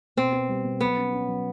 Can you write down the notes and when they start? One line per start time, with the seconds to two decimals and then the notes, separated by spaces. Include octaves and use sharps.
0.17 B2 C4
0.33 B3
0.49 G3
0.65 B2
0.81 F#3 B3
0.97 C#4
1.13 C#4
1.28 F#3